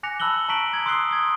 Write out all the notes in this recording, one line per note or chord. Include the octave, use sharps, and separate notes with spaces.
G#5 D6 F#6 A#6 C#7 F7
A5 B5 E6 F#6 F#7 G7
A5 A#5 C#6 B6 D7 F#7
D#6 G#6
C6 D#6 E6 F#6 C7 G7
D#6 G#6